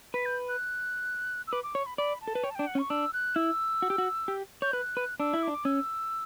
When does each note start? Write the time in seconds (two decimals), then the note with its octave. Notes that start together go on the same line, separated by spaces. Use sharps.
0.14 B4 B6
0.26 G6
0.49 F#6
1.47 E6
1.52 B4 D6
1.63 D6
1.74 C#5 C#6
1.86 B5
1.98 D5 B5
2.21 A5
2.28 A4
2.35 B4
2.44 C#5 G5
2.50 A5
2.55 D4 G5
2.67 F#5
2.75 C#4
2.79 C#6
2.90 D4 E6
3.13 F#6
3.36 E4 E6
3.82 F#4
3.90 G4
3.98 F#4
4.28 G4
4.62 C#5 G6
4.73 B4 F#6
4.97 B4
5.20 D4 E6
5.33 E4
5.43 D4 D6
5.65 C#4 E6